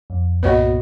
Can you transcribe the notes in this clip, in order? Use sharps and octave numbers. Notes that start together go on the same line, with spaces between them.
F2
C2 G2 A#2 B3 F#4 B4 C#5 D#5